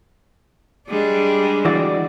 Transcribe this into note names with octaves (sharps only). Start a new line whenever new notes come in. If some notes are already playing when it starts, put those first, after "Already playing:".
G3 G#3 D4
E3 F#4 D5